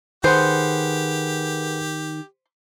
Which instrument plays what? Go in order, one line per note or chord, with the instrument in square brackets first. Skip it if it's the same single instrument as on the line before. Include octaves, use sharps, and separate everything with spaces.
[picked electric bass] D#3 [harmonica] G4 [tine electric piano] G#4 B4 F#5 [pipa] C5